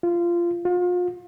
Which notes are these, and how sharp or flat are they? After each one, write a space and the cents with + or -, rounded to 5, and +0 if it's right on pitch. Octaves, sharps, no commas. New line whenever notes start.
F4 -20
F4 +35